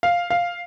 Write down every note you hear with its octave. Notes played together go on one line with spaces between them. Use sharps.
F5
F5